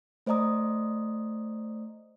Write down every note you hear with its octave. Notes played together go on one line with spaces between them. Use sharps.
A3 C5 D5 D#5 A#5 D#6